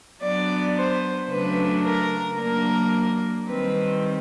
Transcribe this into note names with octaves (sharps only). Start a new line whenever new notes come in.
F#3 B3 D4 D5
C5
C#3 F#3 A3 D4 B4
A#4
F#3 A#3 D4 A#4
D#3 G3 C4 B4